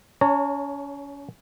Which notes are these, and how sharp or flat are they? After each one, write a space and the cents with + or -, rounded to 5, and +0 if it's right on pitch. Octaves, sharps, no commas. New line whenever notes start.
C#4 +30 C#5 +0 A#5 -45